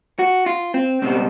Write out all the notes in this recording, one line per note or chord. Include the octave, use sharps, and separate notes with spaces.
F#4
F4
C4
C#2 B2 G3 C4